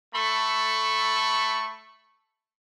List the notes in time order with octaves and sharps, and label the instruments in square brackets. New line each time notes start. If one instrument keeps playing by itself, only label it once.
[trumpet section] A3 A4 B5 C#6